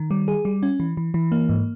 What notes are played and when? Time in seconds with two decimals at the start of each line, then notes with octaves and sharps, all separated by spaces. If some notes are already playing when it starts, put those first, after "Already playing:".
Already playing: D#3
0.11 G3
0.28 G#4
0.45 G3
0.63 C#4
0.80 E3
0.97 E3
1.14 E3
1.32 A#3
1.49 G#2